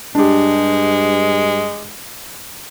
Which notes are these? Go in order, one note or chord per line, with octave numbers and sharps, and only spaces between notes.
G2 G#3 D4 G4